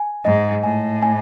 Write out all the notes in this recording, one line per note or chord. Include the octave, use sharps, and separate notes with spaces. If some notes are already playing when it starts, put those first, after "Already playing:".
Already playing: G#5
G#2 D#5
A2 G#5
G#5